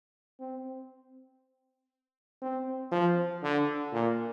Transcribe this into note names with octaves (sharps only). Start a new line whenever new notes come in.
C4
C4
F3
D3
A#2